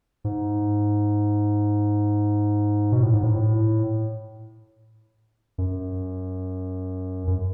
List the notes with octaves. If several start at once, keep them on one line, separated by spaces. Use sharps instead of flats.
G#2
B2
A2
G#2
A2
A2
F#2
F#2